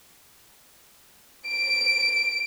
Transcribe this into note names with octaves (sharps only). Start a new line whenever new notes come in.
D7